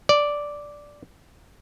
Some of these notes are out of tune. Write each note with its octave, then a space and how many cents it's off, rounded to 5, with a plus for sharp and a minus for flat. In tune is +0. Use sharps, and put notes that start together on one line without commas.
D5 -5